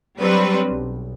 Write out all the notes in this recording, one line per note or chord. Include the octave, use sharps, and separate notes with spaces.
F#3 G3 C4 D4 B4
B1